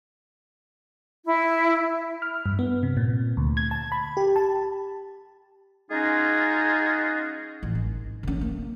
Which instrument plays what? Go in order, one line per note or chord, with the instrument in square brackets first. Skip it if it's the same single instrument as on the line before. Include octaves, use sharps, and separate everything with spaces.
[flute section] E4
[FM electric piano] F6
G2
B3
C3
A#2
D2
G#6
A5
B5
G4
A5
[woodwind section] G#3 C#4 D#4 F4 F#4 G#4
[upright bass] A1
G#1
D3 C#4
A#3